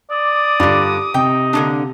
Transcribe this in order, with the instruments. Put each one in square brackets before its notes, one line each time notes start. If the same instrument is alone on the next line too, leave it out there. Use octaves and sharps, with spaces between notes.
[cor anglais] D5 [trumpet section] D6 D#6
[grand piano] G2 [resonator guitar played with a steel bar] D3 F4
[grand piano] C3 [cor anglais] D#4 [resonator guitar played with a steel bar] G5
[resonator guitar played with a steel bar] D3 A#3 D4